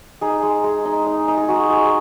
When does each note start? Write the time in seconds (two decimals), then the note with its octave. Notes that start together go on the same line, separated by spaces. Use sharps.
0.21 D#4 G#4
0.43 G#3
0.64 G#3
0.85 D#4
1.06 D#4
1.28 D#4
1.38 G#4
1.48 G#3 F#4
1.70 G#3 G#4